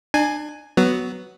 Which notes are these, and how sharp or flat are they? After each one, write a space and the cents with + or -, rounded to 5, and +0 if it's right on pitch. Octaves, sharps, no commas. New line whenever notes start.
D4 +35 G#5 +5
F#3 +10 B3 +5